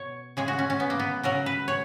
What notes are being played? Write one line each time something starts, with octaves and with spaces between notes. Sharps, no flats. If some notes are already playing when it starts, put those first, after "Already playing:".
Already playing: B2 C#5
C#3 G#3 G#4
F#4
C#4
C#4
B3
A#3
B3
C#3 F#3 A#4
B4
C#5